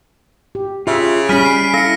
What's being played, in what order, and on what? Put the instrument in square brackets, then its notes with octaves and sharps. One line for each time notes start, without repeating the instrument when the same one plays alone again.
[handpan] G4
[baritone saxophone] C#3 [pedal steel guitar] F4 [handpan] G4 E5
[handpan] G3 C#4 [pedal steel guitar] G#5 B5 [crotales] F6 B6 D#7
[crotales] C7 D7
[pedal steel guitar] E4 A4 [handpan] F5 [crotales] A#6 C#7